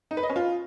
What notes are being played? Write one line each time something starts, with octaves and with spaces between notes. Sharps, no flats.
D#4
B4
D#5
C#4
F4